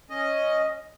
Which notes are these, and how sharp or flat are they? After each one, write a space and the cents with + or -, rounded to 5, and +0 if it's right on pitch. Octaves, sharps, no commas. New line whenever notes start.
C#4 +0 D#5 +0